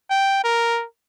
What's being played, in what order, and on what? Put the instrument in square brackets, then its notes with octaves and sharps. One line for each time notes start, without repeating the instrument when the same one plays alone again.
[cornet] G5
A#4